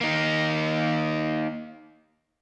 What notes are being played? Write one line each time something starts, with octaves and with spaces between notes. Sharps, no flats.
A#3 D#4